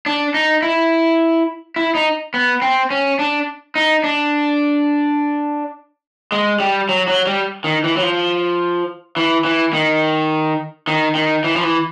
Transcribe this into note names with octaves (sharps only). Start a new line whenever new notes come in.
D4
D#4
E4
E4
D#4
B3
C4
C#4
D4
D#4
D4
G#3
G3
F#3
F#3
G3
D#3
E3
F#3
F3
E3
E3
D#3
D#3
D#3
E3
F3
E3